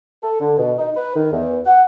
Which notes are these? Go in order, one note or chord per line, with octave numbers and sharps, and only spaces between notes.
A4
D3
B2
D#4
B4
D#3
E2
F#5